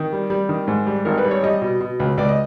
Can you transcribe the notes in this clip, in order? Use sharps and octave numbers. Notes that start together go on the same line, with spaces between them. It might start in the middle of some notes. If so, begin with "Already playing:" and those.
Already playing: D#3
G3
G3
D#3
G#2
G3
G#1 A#4
B4
G3
C#5
G3 D#5
B2
B2
C#2
C#2 D5
D#5